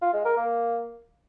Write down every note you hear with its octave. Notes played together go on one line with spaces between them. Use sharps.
F4
G#3
A#4
A#3